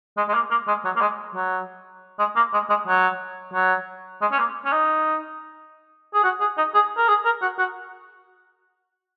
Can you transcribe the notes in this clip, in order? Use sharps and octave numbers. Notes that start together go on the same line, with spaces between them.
G#3
G#3
A#3
A#3
G#3
F#3
A#3
G#3
F#3
G#3
A#3
G#3
G#3
F#3
F#3
G#3
C#4
A#3
C#4
D#4
G#4
F#4
G#4
D#4
G#4
A#4
G#4
A#4
F#4
F#4